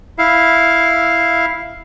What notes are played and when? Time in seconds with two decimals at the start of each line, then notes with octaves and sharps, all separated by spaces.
0.18 E4 F5